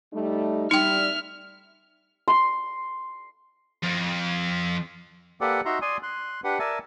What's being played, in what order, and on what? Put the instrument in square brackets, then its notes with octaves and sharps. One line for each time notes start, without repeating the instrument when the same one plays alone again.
[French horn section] G3 A3 D#4
[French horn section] G3 [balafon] D#4 G5 [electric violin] E5 F6
[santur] C6
[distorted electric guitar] F2
[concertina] A#3 G4 A4 B4 D5 F#5
D#4 F#4 E5 A#5 C6
D5 G#5 C6 D#6
C6 F#6
D4 G4 B4 F#5
A#4 D5 E5 G#5 A5